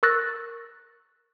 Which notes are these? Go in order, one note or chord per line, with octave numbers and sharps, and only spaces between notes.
A#4 C#6 E6 F#6 A6 A#6